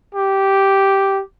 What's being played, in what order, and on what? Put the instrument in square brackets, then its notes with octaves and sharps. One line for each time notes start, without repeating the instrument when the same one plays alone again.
[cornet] G4